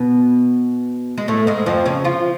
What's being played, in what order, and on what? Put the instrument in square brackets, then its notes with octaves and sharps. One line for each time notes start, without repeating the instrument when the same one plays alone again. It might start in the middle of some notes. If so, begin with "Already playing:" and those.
Already playing: [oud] B2 B3
G#3
A2 A3
G#2 G#3
F2 F3
C#3 C#4
F3 F4